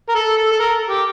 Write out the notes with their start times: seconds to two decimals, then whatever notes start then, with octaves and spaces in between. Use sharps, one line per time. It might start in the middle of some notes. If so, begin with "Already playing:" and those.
0.09 A#4
0.15 A4
0.36 A4
0.52 A4
0.59 A#4
0.89 G4